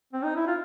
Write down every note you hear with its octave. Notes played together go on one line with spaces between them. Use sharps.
C4
D#4
E4
F4